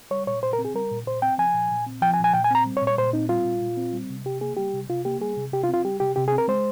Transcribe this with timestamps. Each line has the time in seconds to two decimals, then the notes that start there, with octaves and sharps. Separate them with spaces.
0.11 G3 C#5
0.27 A#2 C#5
0.43 A#2 C5
0.53 A#4
0.58 C4
0.65 G#4
0.74 G3 A#4
0.91 A#2
1.06 A#2 C5
1.22 C4 G5
1.38 F3 G#5
1.54 A#2
1.71 A#2
1.87 C4
2.02 F3 G5
2.14 G#5
2.19 A#2
2.24 G#5
2.34 A#2 G5
2.44 G#5
2.51 C4 A#5
2.66 G3
2.77 C#5
2.82 A#2
2.87 C#5
2.98 A#2 C5
3.13 C4 D#4
3.29 G3 F4
3.45 A#2
3.62 A#2
3.77 C4
3.93 G3
4.10 C3
4.25 C3 G4
4.41 A#3 G#4
4.57 G3 G4
4.73 C3
4.89 C3 F4
5.05 A#3 G4
5.20 G3 G#4
5.37 C3
5.53 C3 G4
5.63 F4
5.69 C4
5.74 F4
5.84 G3 G4
6.00 C3 G4
6.16 C3 G4
6.28 G#4
6.32 C4
6.38 A#4
6.48 G#3 C5